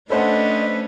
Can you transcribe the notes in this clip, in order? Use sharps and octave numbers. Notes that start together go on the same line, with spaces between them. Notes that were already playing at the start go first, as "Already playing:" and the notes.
A3 C#4 D4 A4 B4 C5 D#5 F#5